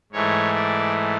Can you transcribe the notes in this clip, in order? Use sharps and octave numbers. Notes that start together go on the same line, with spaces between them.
G#2 E3 A3 C#5
D5